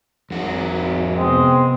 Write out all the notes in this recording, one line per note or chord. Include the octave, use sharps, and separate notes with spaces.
G#1 F2 F#4
C3 G#3 B3 C4